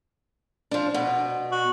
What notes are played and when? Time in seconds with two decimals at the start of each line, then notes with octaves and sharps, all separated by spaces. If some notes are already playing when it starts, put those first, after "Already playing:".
0.71 F3 D4
0.94 B2
1.52 F#4